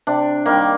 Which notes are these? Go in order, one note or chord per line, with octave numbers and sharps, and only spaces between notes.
C3 D4
D#3 G3 A#3